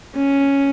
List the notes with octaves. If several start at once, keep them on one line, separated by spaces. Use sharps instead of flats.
C#4